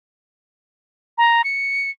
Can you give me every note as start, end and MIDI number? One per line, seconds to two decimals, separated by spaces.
1.18 1.42 82
1.44 1.90 97